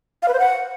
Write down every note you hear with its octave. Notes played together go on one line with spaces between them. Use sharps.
F5
B4
C5
F#5